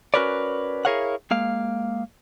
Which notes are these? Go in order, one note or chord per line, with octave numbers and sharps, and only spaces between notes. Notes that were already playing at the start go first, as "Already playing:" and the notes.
C#4 F#4 A#4 B4 C#5 D5
E4 G#4 A#4 C#5 F5 F#5
G#3 A#3 F5